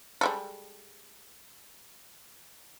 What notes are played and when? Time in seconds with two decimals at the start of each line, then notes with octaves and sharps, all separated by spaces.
0.21 G3 G#3 A4